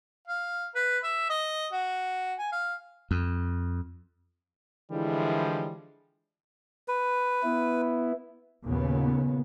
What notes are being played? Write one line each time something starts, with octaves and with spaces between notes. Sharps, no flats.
F5
B4
E5
D#5
F#4
G#5
F5
F2
D3 E3 F3 G3 G#3 E4
B4
B3 E4
D#2 A#2 C#3 B3